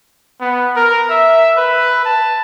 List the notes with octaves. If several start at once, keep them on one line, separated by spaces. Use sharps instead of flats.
B3
A#4
E5
B4
A5